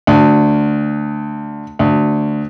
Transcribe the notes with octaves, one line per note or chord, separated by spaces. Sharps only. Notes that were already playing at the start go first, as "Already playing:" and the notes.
D2
D2